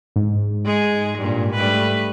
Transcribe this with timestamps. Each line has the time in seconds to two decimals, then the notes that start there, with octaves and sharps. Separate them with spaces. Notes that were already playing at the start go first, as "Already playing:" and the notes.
0.16 G#2
0.65 G#3 G#4
1.18 G2 A#2
1.55 G3 A3 B4